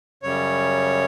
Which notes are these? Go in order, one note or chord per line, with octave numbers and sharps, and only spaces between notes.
F#2 C#3 G3 C#5